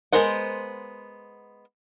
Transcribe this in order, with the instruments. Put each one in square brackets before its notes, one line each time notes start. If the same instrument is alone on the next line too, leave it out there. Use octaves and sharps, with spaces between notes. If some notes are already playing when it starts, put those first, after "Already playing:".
[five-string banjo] G#3 B3 A#4 C5 F#5